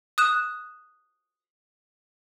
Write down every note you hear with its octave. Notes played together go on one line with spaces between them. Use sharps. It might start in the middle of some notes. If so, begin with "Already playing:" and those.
D#6 F#6 E7